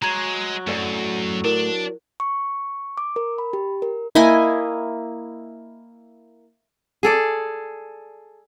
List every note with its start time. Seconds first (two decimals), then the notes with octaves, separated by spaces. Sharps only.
0.02 F#3 G#3 F#4 A#5 G#6
0.67 F#2 A2 A4 D5
1.44 D4 E4 A#4
2.20 C#6
2.97 D6
3.16 A#4
3.38 B5
3.53 G4
3.82 A#4
4.15 A#3 E4 D#5 G#5
7.03 G#4 A4 D5